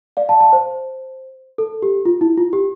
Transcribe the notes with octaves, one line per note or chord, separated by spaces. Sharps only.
D5 F5
F5 A5
F5 A5
C5
A4
G4
F4
E4
F4
G4